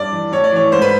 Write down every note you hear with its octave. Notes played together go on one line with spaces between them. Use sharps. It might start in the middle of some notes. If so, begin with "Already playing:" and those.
Already playing: G2 D5
E3
A2 C#5
D5
E3 C#5
G#2 C5
B4